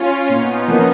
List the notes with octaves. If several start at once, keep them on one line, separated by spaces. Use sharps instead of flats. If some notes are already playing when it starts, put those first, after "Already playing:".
Already playing: C#4 F4
A#2 B3 D#4
F3 A#3 C#4